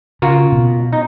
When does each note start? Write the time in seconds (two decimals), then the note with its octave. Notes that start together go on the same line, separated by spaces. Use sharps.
0.22 C#3 F4 F#4 A#4
0.52 B2
0.93 D#4